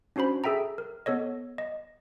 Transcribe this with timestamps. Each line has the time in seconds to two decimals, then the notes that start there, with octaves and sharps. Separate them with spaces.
0.16 C#4 D4 F#4 C5 B5
0.44 G#4 A4 E5 G5 A#5
0.78 A#4
1.06 B3 A4 C#5 D#5
1.58 D#5